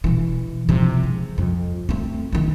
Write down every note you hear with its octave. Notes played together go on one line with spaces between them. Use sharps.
B2 E3
C3 F3
G#3
F2
A3 C4
D2 D#3